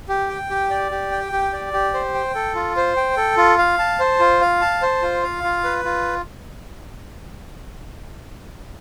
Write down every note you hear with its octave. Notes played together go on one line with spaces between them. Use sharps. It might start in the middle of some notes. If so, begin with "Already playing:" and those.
G4
G5
G4
D5
G4
G5
G4
D5
G4
C5
G5
A4
F4
C5
G5
A4
F4
F5
A5
C5
F4
F5
A5
C5
F4
F5
F4
B4
F4